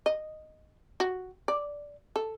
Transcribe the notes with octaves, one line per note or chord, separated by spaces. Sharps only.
D#5
F#4
D5
A4